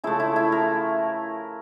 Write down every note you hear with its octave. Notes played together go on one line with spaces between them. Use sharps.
C#3 F3 A3 E4
E4
E4
A#4